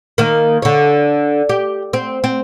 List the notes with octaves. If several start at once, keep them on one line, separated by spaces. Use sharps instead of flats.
D#3 A#3
D3 C#5
G4
C4
C4